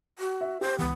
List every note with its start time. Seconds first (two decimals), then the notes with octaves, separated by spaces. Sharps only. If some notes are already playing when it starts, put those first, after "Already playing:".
0.19 F#4
0.41 E5
0.61 G4 C5
0.79 C#2 E3 B3